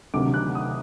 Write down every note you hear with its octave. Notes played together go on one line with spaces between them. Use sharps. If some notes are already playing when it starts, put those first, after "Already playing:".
D2 C3 D#3 F#3 D6
F#6
D#6